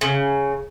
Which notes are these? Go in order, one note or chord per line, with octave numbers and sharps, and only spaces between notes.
C#3